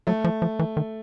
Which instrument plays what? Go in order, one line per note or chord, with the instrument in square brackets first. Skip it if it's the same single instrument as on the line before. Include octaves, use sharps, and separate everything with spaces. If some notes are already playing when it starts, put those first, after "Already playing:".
[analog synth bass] F#3 [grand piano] A3
[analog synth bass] F3
F3
E3
D#3